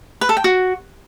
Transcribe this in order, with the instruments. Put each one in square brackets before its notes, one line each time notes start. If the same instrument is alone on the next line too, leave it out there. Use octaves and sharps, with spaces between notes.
[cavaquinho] B4
A4
G5
F#4